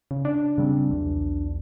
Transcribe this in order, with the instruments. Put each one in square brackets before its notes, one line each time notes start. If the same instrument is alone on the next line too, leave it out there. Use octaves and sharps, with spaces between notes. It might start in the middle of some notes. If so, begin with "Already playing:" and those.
[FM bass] C#3
D4
[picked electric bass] C#3 G3 C4
B1 E2